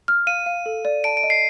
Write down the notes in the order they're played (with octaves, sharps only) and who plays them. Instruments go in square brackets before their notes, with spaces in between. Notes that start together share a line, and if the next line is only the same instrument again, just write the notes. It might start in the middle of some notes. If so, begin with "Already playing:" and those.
[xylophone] F6
[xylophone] F5 [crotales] D#7
[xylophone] F5
A4
D5
[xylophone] A5 [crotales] D7
[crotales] D7
[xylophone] D#5
[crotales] C7